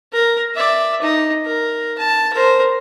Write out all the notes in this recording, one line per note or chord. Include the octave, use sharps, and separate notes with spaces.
A#4
D5 E5
D#4
A#4
A5
A#4 C5